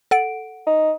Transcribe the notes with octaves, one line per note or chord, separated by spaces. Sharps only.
A4 F#5 D7
D#4